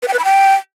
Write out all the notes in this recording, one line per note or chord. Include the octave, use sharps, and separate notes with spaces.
B4
G5
B4
B5
G5